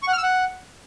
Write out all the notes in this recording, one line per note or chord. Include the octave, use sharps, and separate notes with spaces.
C#6
F#5
F6
E6
F#5